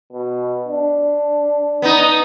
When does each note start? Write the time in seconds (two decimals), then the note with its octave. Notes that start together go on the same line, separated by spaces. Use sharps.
0.13 B2
0.68 D4
1.82 B3 D#4